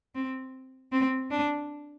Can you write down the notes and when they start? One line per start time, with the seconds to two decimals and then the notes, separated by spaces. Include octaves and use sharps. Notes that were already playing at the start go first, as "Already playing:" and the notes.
0.15 C4
0.92 C4
1.31 D4